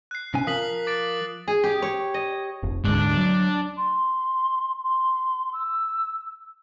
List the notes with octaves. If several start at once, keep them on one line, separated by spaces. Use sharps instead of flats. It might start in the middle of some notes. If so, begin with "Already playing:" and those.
F#6 C7
C3 C#4 G#5
F3 A#4 F5 D#6 B6 F#7
D6 A6 D7
G#4
G4
C#5
D#5
F1
D2 G#2 D4
F#3
C6
C6
E6